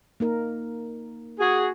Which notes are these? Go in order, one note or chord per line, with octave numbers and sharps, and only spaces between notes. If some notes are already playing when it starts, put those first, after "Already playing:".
A#3 D#4 A#4
F#4 G#4